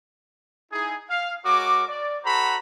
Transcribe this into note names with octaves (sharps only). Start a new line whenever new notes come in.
D#4 E4 G#4
F5
G#3 F#4 A#4 C#5 D6
D5
F#4 A4 C5 F#5 A#5 B5